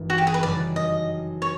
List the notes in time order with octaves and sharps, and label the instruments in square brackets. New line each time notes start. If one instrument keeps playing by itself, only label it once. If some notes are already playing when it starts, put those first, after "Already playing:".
Already playing: [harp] G#1 G2 E3
[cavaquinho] F#4
G4
G#4
B4
[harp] F#1 F#2 D#3 G3 [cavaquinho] D5
[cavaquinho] D#5
C#5